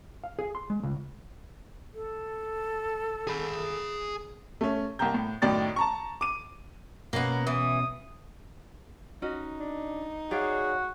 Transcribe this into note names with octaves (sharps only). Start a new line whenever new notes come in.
F5
G#4
C6
G#3
C#2
A4
G#4 B5
A3 C#4
C2 A#3 G5 A#5 G6
A2
F#2 A2 D#3 D5 G5 A6
A5 A#5 C#6
D6 D#7
B2 A#3 B3 C#4
E3 D#6
C#4 D#4 F#4 D#5
D4
F#4 G#4 C#5 D5 F5